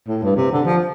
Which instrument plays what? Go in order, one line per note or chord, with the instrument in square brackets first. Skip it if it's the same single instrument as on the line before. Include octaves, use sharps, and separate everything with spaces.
[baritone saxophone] A2
G2
C3
D3
F3